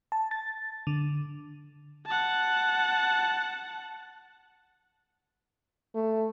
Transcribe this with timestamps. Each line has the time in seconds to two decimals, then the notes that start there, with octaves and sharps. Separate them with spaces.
0.12 A5
0.31 A6
0.87 D3
2.06 F#5 A5
5.95 A3